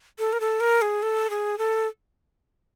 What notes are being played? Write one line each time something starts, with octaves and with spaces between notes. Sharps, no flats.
A4
A#4
A4
A#4
G#4
A4
G#4
A4